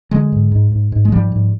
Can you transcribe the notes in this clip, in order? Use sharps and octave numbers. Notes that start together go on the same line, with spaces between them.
D3 F#3 G#3
G#2
G#2
G#2
G#2
G#3
G#2 F3 G3
G#2